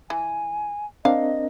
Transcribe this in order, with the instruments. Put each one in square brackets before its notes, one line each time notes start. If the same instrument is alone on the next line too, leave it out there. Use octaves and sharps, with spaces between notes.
[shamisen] E3 [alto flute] G#5
[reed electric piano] C4 D4 A#4 [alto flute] D#5 [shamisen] F5